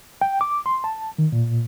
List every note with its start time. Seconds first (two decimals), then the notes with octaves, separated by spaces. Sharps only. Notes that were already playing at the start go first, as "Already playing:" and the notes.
0.21 G5
0.41 D6
0.66 C6
0.84 A5
1.18 D#3
1.32 A#2